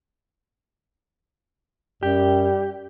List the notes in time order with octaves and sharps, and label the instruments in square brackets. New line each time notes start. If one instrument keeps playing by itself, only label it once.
[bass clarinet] F#2 [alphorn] G3 [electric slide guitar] G4